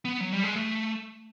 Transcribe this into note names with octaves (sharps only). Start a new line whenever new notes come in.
B3
F#3
G3
G#3
A3